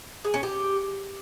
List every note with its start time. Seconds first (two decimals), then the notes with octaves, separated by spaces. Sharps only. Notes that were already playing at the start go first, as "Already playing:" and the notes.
0.25 G#4
0.34 C#4
0.43 G4